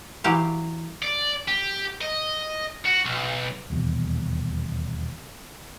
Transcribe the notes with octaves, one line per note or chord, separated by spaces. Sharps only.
E3 F#3 G4 F5
D5
G4
D#5
F#4
B1
D#1 E2 B2